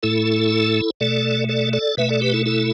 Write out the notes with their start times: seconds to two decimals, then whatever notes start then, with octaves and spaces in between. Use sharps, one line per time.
0.03 A2 A3 E4 A4
1.00 B2 A3 A4 D5
1.49 A4 D5
1.73 A4 D5
1.97 B2 A3 B4 E5
2.09 A4 D5
2.21 G4 B4
2.34 E4 A4
2.46 E4 A4